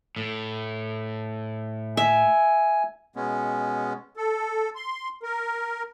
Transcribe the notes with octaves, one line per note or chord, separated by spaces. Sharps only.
A2
E5 G#5
B2 G#3 B3 C#4
A4
C6
A#4